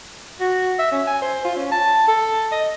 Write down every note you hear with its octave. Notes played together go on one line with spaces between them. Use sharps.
F#4
E5
C#4
G#5
C5
F4
C#4
A5
A4
D#5